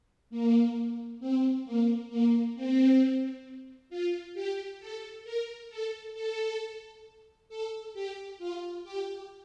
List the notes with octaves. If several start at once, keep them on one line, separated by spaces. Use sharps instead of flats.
A#3
C4
A#3
A#3
C4
F4
G4
A4
A#4
A4
A4
A4
G4
F4
G4